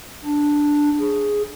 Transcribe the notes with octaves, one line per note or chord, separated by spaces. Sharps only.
D4
G#4